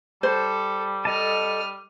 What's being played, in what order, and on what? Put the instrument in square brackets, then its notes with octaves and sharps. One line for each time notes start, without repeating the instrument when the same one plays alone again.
[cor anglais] G3 [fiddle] A4 [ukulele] C5
[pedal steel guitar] A4 D#5 A5 [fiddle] D#6 F6